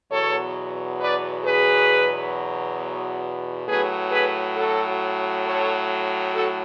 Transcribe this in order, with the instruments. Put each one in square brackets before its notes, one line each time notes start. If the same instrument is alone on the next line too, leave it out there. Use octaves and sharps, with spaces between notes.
[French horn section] E2 B2 F#3 A4 C#5
B4 D5
G#4 B4
A2 F#3 G#4 B4
G#4 B4
F#4 A4
A4 C#5
F#4 A4